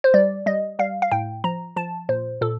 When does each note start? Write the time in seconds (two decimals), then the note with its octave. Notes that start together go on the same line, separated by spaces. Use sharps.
0.04 C5
0.14 G3 D5
0.46 G3 D#5
0.79 G3 F5
1.02 F5
1.12 A2 G5
1.44 F3 A#5
1.76 F3 A5
2.09 A#2 C5
2.41 A#2 A4